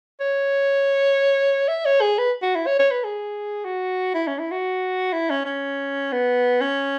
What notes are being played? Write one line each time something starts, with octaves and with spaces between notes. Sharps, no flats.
C#5
E5
C#5
G#4
B4
F#4
E4
C#5
C#5
B4
G#4
F#4
E4
C#4
E4
F#4
E4
C#4
C#4
B3
C#4